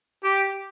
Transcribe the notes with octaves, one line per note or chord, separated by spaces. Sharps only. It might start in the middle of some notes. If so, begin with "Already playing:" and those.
G4